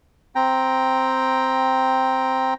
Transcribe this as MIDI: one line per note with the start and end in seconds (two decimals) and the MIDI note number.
0.35 2.54 60
0.35 2.54 79
0.35 2.54 82